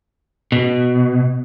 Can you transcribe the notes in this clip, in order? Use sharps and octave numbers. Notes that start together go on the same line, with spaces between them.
B2